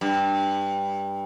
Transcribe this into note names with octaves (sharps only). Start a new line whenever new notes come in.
G2